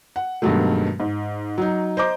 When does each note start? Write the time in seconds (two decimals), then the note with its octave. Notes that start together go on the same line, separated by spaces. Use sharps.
0.16 F#5
0.42 G2 B2 D#3 F#3 G#3 A3
1.00 G#2
1.58 F#3 D#4
1.97 C5 D#5 A#5 D6